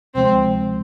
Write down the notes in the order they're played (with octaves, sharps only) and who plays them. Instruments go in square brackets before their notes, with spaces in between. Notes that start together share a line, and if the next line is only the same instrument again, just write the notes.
[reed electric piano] D2 C3 F3 G#3 [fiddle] C4